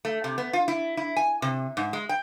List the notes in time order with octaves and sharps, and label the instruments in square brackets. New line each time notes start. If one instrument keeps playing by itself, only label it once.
[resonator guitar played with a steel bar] A3
C3
B3
F4
E4
E4
G#5
C3
G#2
G#3
G5